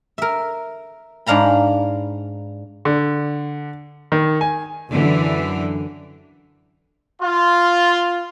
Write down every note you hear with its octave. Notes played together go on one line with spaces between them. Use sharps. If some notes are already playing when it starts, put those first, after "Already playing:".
A#4 E5
G#2 D4 F5 A#5 B5
D3
D#3
G#5
F#2 D3 E3
F4